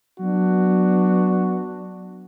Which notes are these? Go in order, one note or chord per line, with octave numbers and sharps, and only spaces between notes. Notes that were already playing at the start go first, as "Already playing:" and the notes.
F#3 B3 D4 F#4